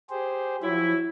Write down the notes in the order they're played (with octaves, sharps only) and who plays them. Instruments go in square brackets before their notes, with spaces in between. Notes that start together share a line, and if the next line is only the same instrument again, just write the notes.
[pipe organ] G4 G#4 C5
[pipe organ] F3 [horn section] F#3 E4